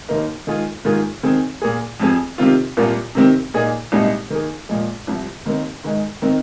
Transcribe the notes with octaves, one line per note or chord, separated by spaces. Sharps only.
D#2 D#3 A#3 D#4 A#4
D#3 G#3 F4 G#4
G#2 D#3 A#3 F4 G#4
D#3 C4 G#4
A#2 A#3 G#4
F2 F3 C4 G#4
C3 D#3 C4 F4
C2 A#2 A#3 F4
C3 D#3 C4
A#2 A#3 D#4 G#4
C2 A#2 G#3 D#4
D#3 A#3 G#4
A#2 F3 G#3
C2 C3 F3
D#2 D#3 C4 D#4 A#4
G#2 D#3 G#3 D#4
D#3 C4 D#4 A#4